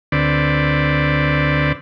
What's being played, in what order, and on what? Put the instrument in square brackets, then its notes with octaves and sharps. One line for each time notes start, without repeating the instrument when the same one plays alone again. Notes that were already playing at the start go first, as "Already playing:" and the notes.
[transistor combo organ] D2 D3 C4 B4 D5